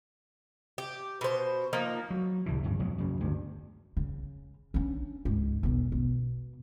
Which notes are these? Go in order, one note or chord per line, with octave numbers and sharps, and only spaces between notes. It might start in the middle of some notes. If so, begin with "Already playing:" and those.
G4
B2 C5
F3 A#3 D#4
F#3
C2 A2 E3
D1 G1 G2 C#3
B1 F2 G#2 F#3
F#2 C#3
G1 D2 G2
C#3
C#4 D4
C#2 G#2
B1 E2
B2